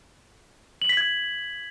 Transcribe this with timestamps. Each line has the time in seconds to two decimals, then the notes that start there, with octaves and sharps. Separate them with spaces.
0.82 F#7
0.89 B6
0.97 G#6